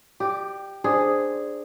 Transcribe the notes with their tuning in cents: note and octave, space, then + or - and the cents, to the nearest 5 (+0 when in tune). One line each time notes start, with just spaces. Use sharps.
G4 +0 D5 +35
D4 +15 G#4 +0 C5 +0